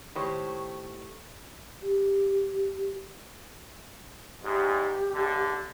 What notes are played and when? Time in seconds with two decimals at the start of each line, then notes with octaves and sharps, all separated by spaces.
0.15 A2 D#3 G4 C5 C#5
1.82 G4
4.43 E2 G#2 G4
5.12 B1 D3